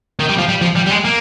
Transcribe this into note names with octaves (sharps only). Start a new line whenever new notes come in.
D#3
G3
F3
G3
F3
G3
G3
G#3
A#3